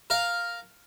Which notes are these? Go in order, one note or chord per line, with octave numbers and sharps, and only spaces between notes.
A#4 F5